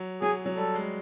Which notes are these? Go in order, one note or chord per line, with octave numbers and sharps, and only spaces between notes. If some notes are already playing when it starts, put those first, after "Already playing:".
Already playing: F#3
F#3 G#4
F#3
G3 A4
G#3